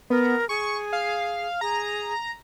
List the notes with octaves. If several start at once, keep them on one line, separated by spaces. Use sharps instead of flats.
B3 A#4
G#4 C#6
F5
G#4 A#5